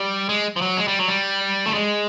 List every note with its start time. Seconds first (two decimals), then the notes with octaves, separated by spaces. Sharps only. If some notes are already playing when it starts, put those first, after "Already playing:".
Already playing: G3
0.29 G#3
0.56 F3
0.62 F#3
0.77 G#3
0.88 G3
0.99 F#3
1.08 G3
1.66 A3
1.74 G#3